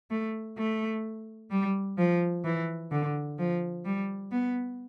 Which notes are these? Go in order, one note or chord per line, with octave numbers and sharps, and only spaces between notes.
A3
A3
G3
F3
E3
D3
F3
G3
B3